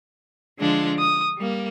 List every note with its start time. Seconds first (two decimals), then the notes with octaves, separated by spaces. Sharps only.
0.59 D3 F3 G#3 D4 F4
0.99 D#6
1.39 G3 A#3